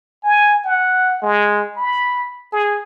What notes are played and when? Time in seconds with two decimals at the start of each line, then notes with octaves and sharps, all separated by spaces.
0.24 G#5
0.65 F#5
1.22 G#3
1.77 B5
2.52 G#4